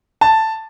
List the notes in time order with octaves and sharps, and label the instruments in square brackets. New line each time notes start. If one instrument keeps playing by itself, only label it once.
[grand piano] A5